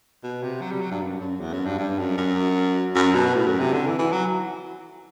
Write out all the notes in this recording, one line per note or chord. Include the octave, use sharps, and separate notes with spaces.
B2
C3
F#3
G3
F#3
G2
F#2
F#2
E2
F#2
G2
G2
F#2
F#2
F#2
B2
A2
F#2
C3
D3
E3
E3
F#3